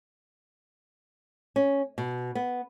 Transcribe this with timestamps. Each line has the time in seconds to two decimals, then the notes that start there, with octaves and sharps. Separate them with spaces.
1.56 C#4
1.98 B2
2.35 B3